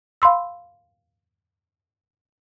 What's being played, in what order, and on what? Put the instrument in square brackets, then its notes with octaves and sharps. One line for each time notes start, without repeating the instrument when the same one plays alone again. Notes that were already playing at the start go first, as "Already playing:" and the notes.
[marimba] F5 B5 C6 E6